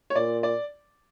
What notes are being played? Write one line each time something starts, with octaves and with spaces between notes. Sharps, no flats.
C#5
A#2 D5
D5